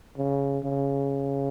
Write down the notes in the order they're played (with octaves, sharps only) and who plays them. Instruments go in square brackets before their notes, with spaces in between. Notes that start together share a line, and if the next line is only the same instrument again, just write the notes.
[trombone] C#3
C#3